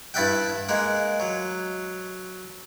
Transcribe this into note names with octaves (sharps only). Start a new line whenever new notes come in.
G2 E4 D5 E5 F#5 G5
G#3 A#3 F#5
F#3